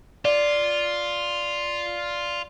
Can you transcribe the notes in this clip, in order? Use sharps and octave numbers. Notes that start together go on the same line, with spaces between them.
F4 D5